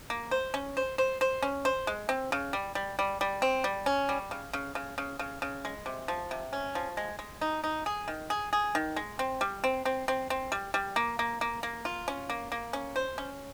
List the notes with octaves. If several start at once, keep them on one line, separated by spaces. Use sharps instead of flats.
A#3
C5
C#4
C5
C5
C5
C#4
C5
G#3
C4
C#3
G3
G3
G3
G3
C4
G3
C#4
G3
C#3
C#3
C#3
C#3
C#3
C#3
G#3
C3
F3
C3
C#4
F3
G#3
G#3
D#4
D#4
G#4
D#3
G#4
G#4
D#3
G#3
C4
G3
C4
C4
C4
C4
G3
G3
A#3
A#3
A#3
A#3
F4
C#4
A#3
A#3
C#4
C5
C#4